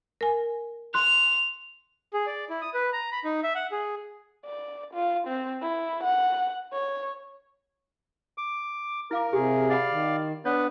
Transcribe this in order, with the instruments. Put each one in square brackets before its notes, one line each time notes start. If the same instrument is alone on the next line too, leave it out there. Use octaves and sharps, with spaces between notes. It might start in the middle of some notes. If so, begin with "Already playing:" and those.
[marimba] A#4 G#5
[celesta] C6 F#6 [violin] F7
[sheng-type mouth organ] G#4
D5
E4
D#6
B4
A#5
B5
D#4
E5
F#5
G#4
[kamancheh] D5
F4
C4
E4
F#5
C#5
[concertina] D6
[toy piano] E4 F5 D6 [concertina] A#4
[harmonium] C3 G#4 [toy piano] G4
[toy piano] F4 F#5 B5 [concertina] D5 F5
[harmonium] D#3
[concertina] B3 B4 [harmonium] D4 [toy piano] C#5